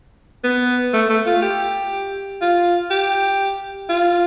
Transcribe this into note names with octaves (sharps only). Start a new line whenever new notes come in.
B3
A3
A3
F4
G4
F4
G4
F4